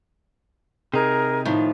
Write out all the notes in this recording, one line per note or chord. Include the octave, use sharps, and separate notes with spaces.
C3 D#4 G#4 A#4
A2 D#3 F3